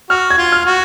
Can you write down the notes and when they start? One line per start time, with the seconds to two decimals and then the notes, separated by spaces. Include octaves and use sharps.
0.10 F#4 F6
0.30 G#6
0.38 F4
0.52 F6
0.66 F#4